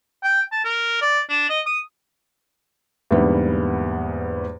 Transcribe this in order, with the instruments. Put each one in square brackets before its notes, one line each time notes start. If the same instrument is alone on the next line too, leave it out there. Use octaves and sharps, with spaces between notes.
[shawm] G5
A5
A#4
D5
D4
D#5
D#6
[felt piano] E2 G#2 D3 G3 A#3 B3